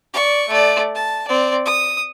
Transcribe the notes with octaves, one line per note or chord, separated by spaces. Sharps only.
D5 C#6
A3 D5
A5
C4 D5
D#6